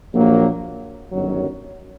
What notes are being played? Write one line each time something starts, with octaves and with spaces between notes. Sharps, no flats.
A#1 A#2 F#3 A#3
G1 F#2 D#3 F#3